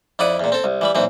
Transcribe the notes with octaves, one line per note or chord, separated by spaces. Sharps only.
F2 E4 D5 F#5 D6 D#6
E2 A#2
C4 A4
C2
E3 G3 B5
B1 A#2 E3 C4